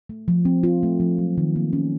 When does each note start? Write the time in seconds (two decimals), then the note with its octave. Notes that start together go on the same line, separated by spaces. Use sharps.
0.09 A3
0.28 F3
0.45 C4
0.63 F4
0.83 A3
1.00 F3
1.18 F#3
1.38 D#3
1.56 A#3
1.73 C#4